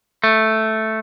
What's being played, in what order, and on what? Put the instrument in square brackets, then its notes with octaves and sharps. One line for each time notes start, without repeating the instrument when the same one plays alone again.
[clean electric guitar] A3